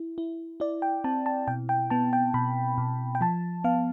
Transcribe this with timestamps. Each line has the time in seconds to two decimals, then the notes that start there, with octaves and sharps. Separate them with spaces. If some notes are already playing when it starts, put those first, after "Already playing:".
Already playing: E4
0.18 E4
0.60 E4 D5
0.82 G5
1.04 C4 A5
1.26 A5
1.48 B2 G5
1.69 G5
1.90 B3 A5
2.13 G5
2.34 B2 B5
2.78 B2
3.15 G5
3.21 F3 A5
3.64 B3 F5